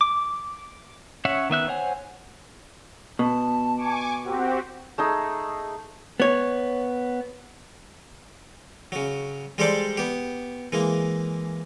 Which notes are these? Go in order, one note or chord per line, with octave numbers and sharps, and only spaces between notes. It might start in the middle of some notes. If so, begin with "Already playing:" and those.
D6
C#4 C#5 E5 F#5
D#3 B3 E5 F#6
C5 C#5 F#5 G#5
B2 A5
G#5 C#6 D6
C4 F#4 G4 A#4
A3 D#4 G#4
B3 C#5
C#3 F#3
G3 G#3 G4 A4 C5 D5
B3 G4
E3 G#3 A#3